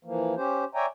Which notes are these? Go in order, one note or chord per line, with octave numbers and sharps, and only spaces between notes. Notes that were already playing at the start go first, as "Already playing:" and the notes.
E3 F3 A#3
C#4 G4 C5
C#5 D5 E5 G5 G#5 A#5